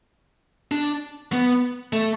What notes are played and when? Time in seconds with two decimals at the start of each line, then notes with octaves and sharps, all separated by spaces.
0.72 D4
1.33 B3
1.93 A3